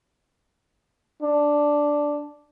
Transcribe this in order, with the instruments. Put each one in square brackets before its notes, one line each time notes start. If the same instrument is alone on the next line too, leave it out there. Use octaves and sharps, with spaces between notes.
[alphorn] D4